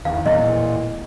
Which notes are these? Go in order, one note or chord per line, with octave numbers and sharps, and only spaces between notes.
E2 D#3 F5
A1 E2 A#2 E4 D#5